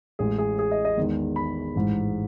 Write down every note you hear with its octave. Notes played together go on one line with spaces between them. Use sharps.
A1 A2 G#3 G#4
G#4
G#4
D#5
D#5
E2 D#3 G#3
B5
A1 G#2 E3 G#3